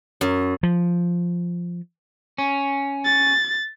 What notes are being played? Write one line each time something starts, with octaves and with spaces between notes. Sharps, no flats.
F#2
F3
C#4
A6